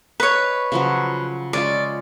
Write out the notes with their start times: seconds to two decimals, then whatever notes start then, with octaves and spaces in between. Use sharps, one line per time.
0.20 B4 C#5 D#5
0.72 C#3 F3 F#3
1.53 G#3 C#4 F4 D5